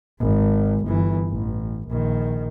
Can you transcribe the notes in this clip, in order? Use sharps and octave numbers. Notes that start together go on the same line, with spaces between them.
G#1
G1 E3
A1
A#1 D#3